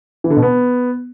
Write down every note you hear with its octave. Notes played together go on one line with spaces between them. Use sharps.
E3
D3
B2
B3